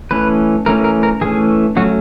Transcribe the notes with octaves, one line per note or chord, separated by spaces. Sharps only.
E3 A3 C#4 B4
E3 A3 C#4 A#4
A#4
A#4
E3 A3 C#4 G#4
F#3 A3 C#4 F#4